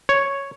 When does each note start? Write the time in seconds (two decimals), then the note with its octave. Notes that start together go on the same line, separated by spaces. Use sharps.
0.09 C#5